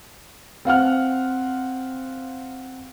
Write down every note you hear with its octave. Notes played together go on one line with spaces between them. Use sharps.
C4 F5 F#5 F6